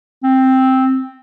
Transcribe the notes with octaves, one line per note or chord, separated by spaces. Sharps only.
C4